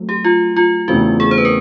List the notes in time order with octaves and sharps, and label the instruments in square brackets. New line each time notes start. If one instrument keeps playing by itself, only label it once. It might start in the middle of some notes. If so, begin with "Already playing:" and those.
Already playing: [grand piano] F#3 A3 C4
[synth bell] G4
F4
F4
[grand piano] E2 C#3 E3 A3 C4 [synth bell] F#4
[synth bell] G#4
C5
B4
A#4